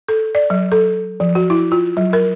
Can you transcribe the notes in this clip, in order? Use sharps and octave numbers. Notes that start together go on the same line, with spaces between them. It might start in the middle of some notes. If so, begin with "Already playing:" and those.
A4
D5
F#3
A4
F3
F#4
E4
F4
F#3
A#4